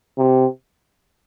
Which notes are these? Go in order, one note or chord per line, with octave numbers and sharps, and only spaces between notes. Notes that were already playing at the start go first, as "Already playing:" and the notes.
C3